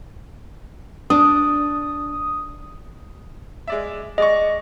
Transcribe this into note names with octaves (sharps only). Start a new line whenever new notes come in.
D4 D#6
G#3 D5 E5
G#3 D5 D#5 C#6